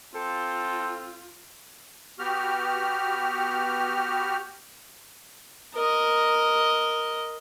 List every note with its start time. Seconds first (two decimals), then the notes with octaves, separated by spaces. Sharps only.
0.15 C4 F4 A4
2.19 B3 F#4 G4 F6
5.75 A#4 D#5